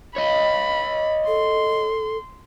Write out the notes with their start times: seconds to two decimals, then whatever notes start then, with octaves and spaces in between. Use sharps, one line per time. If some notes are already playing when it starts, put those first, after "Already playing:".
0.16 C#5 D#5 B5
1.27 A4 C6